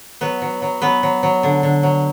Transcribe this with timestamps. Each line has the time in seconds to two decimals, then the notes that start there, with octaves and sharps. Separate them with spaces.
0.21 F#3 B3 B4
0.42 F#3
0.62 F#3
0.81 F#3 B3 B4
1.03 F#3
1.23 F#3
1.43 D3
1.63 D3
1.83 F#3